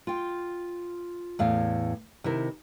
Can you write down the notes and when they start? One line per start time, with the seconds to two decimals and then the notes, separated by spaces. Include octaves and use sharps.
0.07 F4 G5
1.39 E2 A2 F5
2.24 C3 D#3 E4 A#4